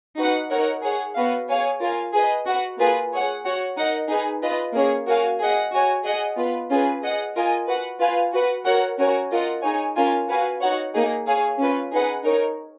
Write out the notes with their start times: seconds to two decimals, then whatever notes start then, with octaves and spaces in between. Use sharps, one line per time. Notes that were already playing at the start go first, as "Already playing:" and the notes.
0.17 D#4 F#4 B4 F#5
0.50 D#4 A#4 C#5 F#5
0.82 G#4 C#5 F#5
1.16 B3 F#4 B4 F5
1.49 G#4 C#5 F5 G#5
1.80 F4 A#4 F5 G#5
2.13 G#4 B4 D#5
2.46 F#4 B4 F#5
2.79 A#3 F4 G#4 B4
3.12 G#4 C#5 F#5
3.44 F#4 C#5 F#5
3.76 D#4 A#4 D#5 F#5
4.09 D#4 G#4 B4
4.42 F4 B4 D#5
4.74 A#3 C#4 G#4 C#5
5.07 F#4 A#4 C#5 F5 G#5
5.40 G#4 D#5 F#5
5.72 F#4 C#5 G#5
6.05 G#4 D#5 F#5
6.37 B3 F4 B4
6.70 C#4 F4 G#4 B4
7.02 G#4 D#5 F#5
7.36 F4 A#4 D#5 G#5
7.68 F#4 B4 F#5
8.01 F4 B4 F5 G#5
8.33 F#4 B4 F#5
8.66 F#4 A#4 C#5 F#5
8.98 C#4 F#4 A#4 C#5 G#5
9.32 F4 A#4 D#5 F#5
9.63 D#4 G#4 C#5 G#5
9.96 C#4 F4 A#4 F5 G#5
10.29 F#4 B4 F5 G#5
10.61 D#4 F#4 C#5 F#5
10.94 A#3 D#4 G#4
11.27 G#4 C#5 F5 G#5
11.59 C#4 F4 B4
11.92 D#4 G#4 B4 F#5
12.25 D#4 A#4 C#5